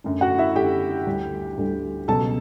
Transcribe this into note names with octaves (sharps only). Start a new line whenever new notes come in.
F#2 D3 A3
F#4 F#5
E4 E5
F#2 D3 A3 G4 G5
D2 D3 G3
D2 D3 G3
C#2 B2 F#3 A4 A5